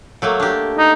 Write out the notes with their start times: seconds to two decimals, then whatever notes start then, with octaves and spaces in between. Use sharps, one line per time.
0.22 F#3 A3 A#3
0.40 D4 G4
0.78 D#4